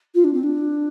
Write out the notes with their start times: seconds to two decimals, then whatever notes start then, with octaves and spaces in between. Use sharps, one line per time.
0.15 F4
0.24 D4
0.33 C4
0.43 D4